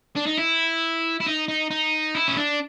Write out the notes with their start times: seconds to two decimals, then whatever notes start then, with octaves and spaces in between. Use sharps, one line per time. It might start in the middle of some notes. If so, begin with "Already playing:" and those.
0.16 D4
0.27 D#4
0.38 E4
1.20 E4
1.26 D#4
1.48 D#4
1.71 D#4
2.15 E4
2.28 C#4
2.37 D4